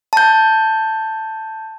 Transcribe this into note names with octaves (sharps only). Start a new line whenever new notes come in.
A5 G6